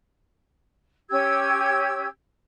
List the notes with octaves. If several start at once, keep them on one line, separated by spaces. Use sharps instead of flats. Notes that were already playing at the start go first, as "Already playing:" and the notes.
C#4 G4 E6 G#6